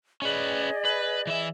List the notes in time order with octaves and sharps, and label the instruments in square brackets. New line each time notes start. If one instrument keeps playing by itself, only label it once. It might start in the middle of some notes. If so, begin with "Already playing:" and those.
[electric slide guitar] C#4 B4 [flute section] G#4 D5 D#5
[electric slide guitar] B4
E3 E5